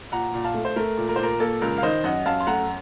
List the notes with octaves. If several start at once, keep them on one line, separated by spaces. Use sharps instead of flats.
A#2 F#5 A#5
A#2
F5 A5
A3
C5
A3 A#4
A#2
A#4
C5
A#2 A#4
A#3 A4
C#2 A#4
F5
D#3 C5 D#5
F#2 D#5 F#5
F#2 F5 A5
C6
A3 F#5 A#5